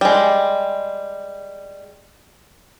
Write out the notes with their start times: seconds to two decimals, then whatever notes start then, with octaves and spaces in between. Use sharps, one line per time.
0.01 G3 G#3